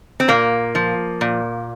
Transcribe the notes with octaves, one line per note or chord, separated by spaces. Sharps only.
C4
A#2 A#3
F3
A#2